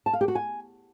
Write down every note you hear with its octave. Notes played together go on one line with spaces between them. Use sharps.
A5
F5
G4
F#4
G#5